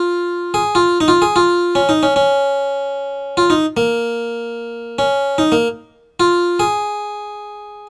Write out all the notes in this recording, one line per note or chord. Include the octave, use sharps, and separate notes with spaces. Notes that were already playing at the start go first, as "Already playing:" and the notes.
Already playing: F4
G#4
F4
D#4
F4
G#4
F4
C#4
D#4
C#4
C#4
F4
D#4
A#3
C#4
D#4
A#3
F4
G#4